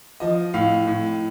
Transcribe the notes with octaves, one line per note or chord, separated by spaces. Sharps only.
F3 D#5
A2 F5
A2